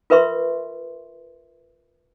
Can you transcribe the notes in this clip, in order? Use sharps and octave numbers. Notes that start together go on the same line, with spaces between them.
F4 A#4 B4 E5 C6 C#6